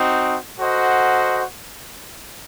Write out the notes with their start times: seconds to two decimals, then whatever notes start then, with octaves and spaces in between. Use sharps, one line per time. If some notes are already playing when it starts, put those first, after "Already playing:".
Already playing: C4 D#4 F#4
0.59 F#4 A4 C5 D#5 F#5